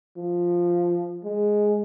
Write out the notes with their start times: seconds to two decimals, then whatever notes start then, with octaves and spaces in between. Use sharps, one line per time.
0.17 F3
1.24 G#3